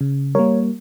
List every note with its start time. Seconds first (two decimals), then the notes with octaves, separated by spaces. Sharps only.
0.01 C#3
0.35 G3 A#3 A#4 C#5